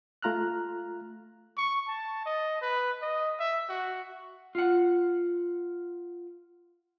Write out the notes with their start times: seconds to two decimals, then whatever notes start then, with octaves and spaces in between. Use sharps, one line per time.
0.22 A3 F4 A#5 F6 F#6
1.57 C#6
1.87 A5
2.26 D#5
2.62 B4
3.02 D#5
3.39 E5
3.69 F#4
4.55 F4 F#5